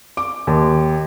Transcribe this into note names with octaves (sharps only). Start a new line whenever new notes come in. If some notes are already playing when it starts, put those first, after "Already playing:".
D6
D#2